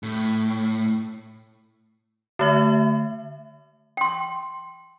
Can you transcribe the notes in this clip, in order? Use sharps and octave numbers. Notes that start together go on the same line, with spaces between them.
A2
D3 A3 E5
G5 C6